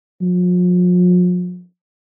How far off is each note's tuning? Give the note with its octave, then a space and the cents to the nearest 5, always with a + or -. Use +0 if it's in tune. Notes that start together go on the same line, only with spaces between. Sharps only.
F3 +45